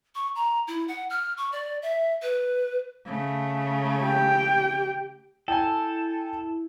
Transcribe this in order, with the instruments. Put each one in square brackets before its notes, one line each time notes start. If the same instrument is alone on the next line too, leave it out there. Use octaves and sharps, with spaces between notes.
[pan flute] C#6
A#5
E4
F#5
F6
C#6
D5
E5
B4
[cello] C#3 A3
[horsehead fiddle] G4 G5
[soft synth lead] E4 [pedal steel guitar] A4 [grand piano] G5 G#5